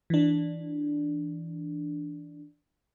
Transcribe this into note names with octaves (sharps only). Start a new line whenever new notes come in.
E3 D4